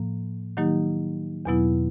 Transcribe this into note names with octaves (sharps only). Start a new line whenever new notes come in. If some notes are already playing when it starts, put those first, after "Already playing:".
Already playing: A2 F3 A#3
D#3 F#3 A#3 D#4 G4
E2 B2 F#3 B3 E4